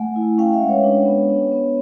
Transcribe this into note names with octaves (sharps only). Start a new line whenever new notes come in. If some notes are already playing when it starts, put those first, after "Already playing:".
Already playing: A3 F#5 G#5
E4
C#4 F5 G5
E5 F#5
G#3
B4 C#5
D4
B3
D4
B3